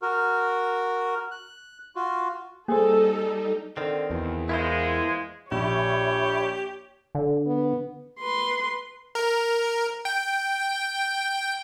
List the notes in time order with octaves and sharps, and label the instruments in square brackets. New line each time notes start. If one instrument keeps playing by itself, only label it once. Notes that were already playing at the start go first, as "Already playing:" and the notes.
[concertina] F#4 A#4
F#6
F4 F#4
[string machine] G3 D#4 [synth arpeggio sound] A#3 C5 [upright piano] G#4 [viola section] A4
[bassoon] D3 [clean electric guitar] D#3 C4
[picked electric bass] E2 [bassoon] B2
[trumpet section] G#3 [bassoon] A#3 [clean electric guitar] E4 F4 C5
[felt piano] A#1 [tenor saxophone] G4 [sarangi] C#5 [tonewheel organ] E5 B5 C#6
[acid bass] D3
[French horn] B3
[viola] B4 C6
[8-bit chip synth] A#4
G5